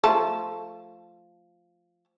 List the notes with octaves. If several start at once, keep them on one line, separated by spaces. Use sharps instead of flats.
F3 A3 A5